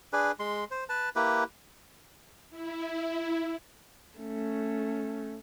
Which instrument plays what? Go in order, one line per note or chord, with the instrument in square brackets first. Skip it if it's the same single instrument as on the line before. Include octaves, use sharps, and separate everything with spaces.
[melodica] D4 G#4 B4
G#3 C6
C5
B4 A5
A#3 E4 G4 B4
[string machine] E4
[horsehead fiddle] A3 C#4